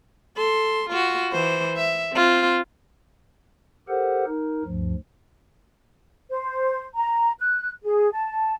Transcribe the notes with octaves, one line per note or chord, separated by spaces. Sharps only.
A4 C6
F4 F#4
E3 C5
E5
C4 F4
G4 A4 A#4 C5 F#5
D#4 A#4
D2 G2 F3
C5
A#5
F#6
G#4
A5